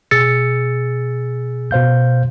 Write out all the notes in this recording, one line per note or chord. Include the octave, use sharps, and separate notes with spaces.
B2 G#4 E6 A6 C#7
B2 C5 F5 G6